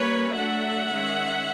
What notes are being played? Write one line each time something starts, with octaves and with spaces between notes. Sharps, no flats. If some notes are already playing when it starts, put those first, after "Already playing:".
Already playing: G3 A#3 C#4 B4 C#5
F#3 A3 D4 E5 F#5
D#3 G#3 C#4